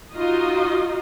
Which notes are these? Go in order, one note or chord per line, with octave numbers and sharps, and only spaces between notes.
D#4 F4 F#4 D#5